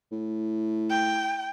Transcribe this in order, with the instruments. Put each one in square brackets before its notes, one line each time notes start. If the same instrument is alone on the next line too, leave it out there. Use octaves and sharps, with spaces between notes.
[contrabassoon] A2
[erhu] G5